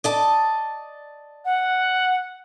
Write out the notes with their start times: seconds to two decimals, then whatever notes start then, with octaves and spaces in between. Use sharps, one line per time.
0.04 D5 D#5 A5
1.45 F#5